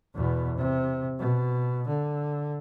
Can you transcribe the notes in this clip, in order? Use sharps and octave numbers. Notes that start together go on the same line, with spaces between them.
E2 B2
C3
B2
D3